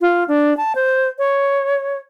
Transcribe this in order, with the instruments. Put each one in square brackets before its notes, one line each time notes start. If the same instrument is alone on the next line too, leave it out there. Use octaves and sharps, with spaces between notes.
[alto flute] F4
D4
A5
C5
C#5